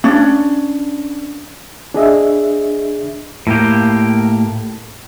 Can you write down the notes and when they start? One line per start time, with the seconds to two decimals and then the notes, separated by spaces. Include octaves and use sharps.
0.04 C#4 D4
1.94 D4 G#4 D#5 E5
3.47 A2 A#3 G4